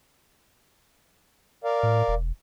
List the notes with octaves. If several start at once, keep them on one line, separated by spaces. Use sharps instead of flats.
A#4 D5 F5
A2
E1